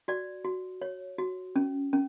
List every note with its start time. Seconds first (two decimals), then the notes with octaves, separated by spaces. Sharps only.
0.08 F#4 D5
0.45 F#4
0.81 C#5
1.18 F#4
1.56 C#4
1.93 C#4